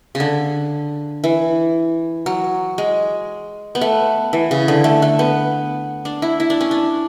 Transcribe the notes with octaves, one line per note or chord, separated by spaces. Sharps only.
C#3
D3
E3
F#3
G#3
B3
A3
E3
C#3
D3
A3
A3
B3
D4
E4
E4
D4
C#4
D4